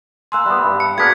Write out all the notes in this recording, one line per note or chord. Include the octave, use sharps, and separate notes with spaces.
A#3 G#5 C6 E6 F#6
G3 B3 E5 B5
G2
C#7
A#3 B3 D4 F#4 G#4 G#6 B6